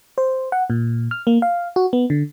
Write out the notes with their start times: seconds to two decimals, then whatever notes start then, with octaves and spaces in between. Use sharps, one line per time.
0.18 C5
0.52 F#5
0.70 A#2
1.11 F6
1.27 A#3
1.42 F5
1.76 F#4
1.93 B3
2.10 D3